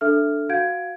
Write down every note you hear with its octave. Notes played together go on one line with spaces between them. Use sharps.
D4 A4 E5 F6
F#4 F5 F#5 G6 G#6 D7